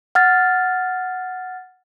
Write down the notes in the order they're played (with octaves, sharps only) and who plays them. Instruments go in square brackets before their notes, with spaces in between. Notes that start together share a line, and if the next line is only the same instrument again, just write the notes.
[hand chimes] F#5 F6 A6